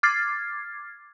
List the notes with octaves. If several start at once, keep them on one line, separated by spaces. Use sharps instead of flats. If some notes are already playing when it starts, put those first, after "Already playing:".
D6 F6 G#6 A6 C7